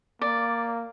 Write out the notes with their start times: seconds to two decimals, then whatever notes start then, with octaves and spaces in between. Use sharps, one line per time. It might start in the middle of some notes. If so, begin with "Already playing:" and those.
0.21 A#3 D5